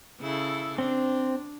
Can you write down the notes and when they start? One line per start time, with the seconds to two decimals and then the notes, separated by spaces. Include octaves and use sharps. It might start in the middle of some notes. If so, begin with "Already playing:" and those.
0.20 C#3 E4 A4
0.78 C4 D4